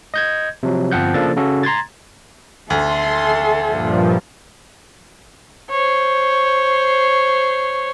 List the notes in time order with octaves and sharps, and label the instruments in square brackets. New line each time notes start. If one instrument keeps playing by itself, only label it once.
[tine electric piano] D#5 G6 G#6
C3 F3 F#3
G1 F3 C4 F#5 G6
C#3 F3 A#3 D4 A4 A6
C#3 C#4 F#4 A4
A#5 C6 G#6 A6
[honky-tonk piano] D2 [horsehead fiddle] A4 E5 [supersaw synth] C6
[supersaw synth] G2 A#2 F3
[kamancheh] C5 C#5